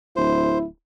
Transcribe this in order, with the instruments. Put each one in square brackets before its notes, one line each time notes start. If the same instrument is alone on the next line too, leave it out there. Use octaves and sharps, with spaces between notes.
[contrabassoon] D1 [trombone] E4 [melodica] C5